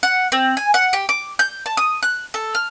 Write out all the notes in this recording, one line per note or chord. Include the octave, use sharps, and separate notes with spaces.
F#5
C4
G#5
F#5
G4
D6
G6
A5
D#6
F#6
A4
F6